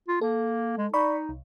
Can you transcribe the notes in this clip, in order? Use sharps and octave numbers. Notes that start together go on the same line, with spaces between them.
F4
A#3 A4
G#3
D#4 D5 B5 C#6
C2